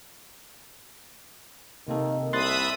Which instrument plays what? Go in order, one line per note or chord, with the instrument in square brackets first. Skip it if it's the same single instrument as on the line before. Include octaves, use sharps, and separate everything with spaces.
[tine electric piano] C3 A#3 A4 [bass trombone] D#3
[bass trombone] C2 [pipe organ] E5 B5 D#6 [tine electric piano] C6 F#6 A6